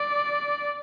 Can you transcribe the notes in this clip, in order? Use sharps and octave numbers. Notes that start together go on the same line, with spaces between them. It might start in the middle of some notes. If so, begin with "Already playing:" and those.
Already playing: D5